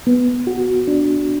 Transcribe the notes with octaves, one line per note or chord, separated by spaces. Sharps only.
B3
F#4
D4